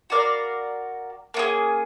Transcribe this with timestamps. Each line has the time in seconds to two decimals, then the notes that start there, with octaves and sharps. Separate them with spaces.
0.10 F#4 A#4 D5 F5
1.34 A#3 C#4 F4 G#4